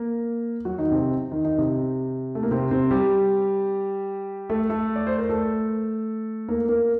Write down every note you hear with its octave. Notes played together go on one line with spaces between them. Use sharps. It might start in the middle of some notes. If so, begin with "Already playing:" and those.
Already playing: A#3 A#4
F#3 F#4
D#3 D#4
C3 C4
D#3 D#4
D#3 D#4
C3 C4
A3
A#3
C3 C4
C3 C4
G3 G4
A3 A4
A3 A4
D5
C5
A#4
A3 A4
A#3 A#4
A#3 A#4